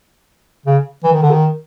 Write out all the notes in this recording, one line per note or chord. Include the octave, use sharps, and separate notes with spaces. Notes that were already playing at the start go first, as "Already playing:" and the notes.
C#3
E3
D#3
D3
D#3